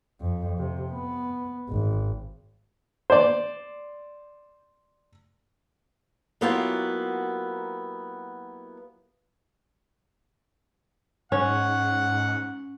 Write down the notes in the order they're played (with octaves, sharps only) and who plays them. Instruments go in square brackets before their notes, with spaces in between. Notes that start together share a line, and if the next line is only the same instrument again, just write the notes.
[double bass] F2
C3
B3
G#1
[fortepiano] C5 D5
[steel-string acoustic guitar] F#3 A#3 B3 E4 F4 G4
[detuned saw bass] G#2 [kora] C#4 [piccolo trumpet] F#5